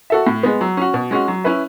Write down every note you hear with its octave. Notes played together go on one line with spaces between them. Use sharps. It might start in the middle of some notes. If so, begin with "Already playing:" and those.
F#4 A4 E5
A2
G#3 B3
F#3
C#4 F#4
B2
G#3 C#4 F#4
F#3
C#4 E4 B4 E5